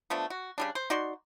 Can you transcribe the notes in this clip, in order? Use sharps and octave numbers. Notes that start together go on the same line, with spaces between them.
F3 A3 B3 D4
F#4
C#3 G3 D4
C5
D#4 F#4 D5 C6